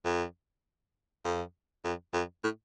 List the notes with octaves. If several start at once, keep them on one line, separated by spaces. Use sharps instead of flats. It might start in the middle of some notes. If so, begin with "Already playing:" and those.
F2
F2
F2
F2
A2